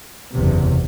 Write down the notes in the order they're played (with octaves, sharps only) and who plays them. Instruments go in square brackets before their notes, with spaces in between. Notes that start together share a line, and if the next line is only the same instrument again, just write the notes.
[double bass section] F#1 E2 C3